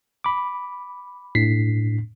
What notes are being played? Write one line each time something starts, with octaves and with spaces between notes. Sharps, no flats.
B5 D6
A2 D4 B6 C7